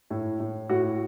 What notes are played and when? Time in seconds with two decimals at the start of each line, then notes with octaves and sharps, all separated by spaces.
0.10 A2
0.40 A2
0.69 A2 F#4